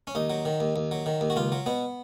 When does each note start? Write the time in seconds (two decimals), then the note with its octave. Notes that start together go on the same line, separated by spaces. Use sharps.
0.07 C#4
0.15 D#2 D#4
0.30 F#3
0.45 D#3
0.60 D#2
0.76 D#2
0.91 F#3
1.06 D#3
1.21 D#2
1.30 F#4
1.36 C#2 F4
1.52 F#3
1.66 B2 B3